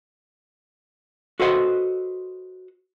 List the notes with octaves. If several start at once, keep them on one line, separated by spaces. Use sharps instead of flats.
F#4 A4 B4 C5 D#5 F#5